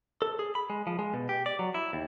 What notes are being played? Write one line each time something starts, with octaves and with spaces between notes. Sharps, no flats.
A4
G#4
B5
G#3
F3
G#3
B2
G4
D5
F#3
E4
D#2